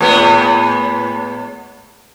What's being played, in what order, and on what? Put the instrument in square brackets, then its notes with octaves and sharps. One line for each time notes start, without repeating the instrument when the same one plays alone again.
[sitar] A2 G#3 B3